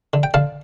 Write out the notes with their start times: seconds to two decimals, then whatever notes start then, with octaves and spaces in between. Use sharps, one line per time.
0.13 D3
0.23 G5
0.34 D3 F5 A5